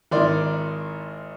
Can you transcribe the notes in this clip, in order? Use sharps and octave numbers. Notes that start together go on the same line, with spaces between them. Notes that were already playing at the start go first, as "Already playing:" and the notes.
G#1 D#3 E4 A#4 D5 C6